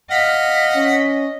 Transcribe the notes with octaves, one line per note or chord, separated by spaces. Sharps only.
D#5 F5 F#5 B6
C#4